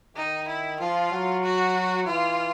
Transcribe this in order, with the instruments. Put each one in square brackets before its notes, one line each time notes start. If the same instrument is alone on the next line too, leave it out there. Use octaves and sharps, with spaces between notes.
[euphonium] D#3 [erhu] D#4
[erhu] E4
[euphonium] F3 [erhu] F4
[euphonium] F#3
[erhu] F#4
[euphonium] E3 [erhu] F4